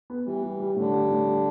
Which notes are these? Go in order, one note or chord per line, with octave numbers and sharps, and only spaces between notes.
B3
E3 G3
G3
G3
A2 D3
G3
A2
G3